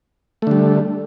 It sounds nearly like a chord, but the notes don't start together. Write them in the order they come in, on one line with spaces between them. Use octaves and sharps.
A3 D3 G3